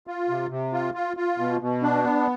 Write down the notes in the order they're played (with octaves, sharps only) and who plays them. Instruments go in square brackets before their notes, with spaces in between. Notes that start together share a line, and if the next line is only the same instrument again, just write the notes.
[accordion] F4
C3
C3
F4
F4
F4
B2
B2
D4
B3